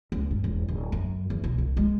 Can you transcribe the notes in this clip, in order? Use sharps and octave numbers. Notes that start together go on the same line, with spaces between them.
C#2
G2
E1
D1
F#2
E2
B1
C2
G#3